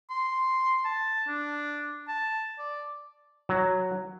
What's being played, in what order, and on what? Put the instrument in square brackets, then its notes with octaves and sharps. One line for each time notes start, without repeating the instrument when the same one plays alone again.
[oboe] C6
A5
D4
A5
D5
[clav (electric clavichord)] F#3